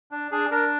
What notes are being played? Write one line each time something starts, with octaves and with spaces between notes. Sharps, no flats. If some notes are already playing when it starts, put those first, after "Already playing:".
D4
D4 G#4
D4 A#4